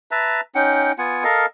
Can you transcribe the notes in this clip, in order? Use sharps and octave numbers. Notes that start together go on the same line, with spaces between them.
B4 E5 A5 A#5
C#4 D#4 F#5 G5
B3 F4 F#5 G#5
A4 A#4 D#5 F5